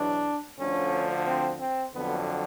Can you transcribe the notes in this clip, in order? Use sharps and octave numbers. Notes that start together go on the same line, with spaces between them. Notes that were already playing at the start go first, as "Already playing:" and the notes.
Already playing: E2 B2 F#3 D4
D2 D3 F3 C#4
C4
C4
F2 D3 F#3 B3